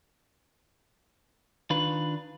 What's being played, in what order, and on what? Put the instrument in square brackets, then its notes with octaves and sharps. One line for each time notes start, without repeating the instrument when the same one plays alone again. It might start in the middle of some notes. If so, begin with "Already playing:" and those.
[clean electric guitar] D#3 D4 F4 B4